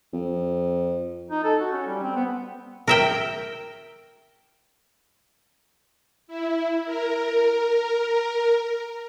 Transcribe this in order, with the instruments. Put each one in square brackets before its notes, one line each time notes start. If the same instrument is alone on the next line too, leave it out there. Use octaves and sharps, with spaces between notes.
[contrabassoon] F2
[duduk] D#4
A4
F#4
C#4
G3
C4
B3
[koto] A#4 E5 G5
[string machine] E4
A#4